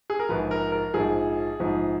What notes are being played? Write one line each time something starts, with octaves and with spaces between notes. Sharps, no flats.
G#4
A#4
A#1 G#2 F3 B4
A#4
A#4
A#1 G#2 F3 G#4
A#1 G#2 F3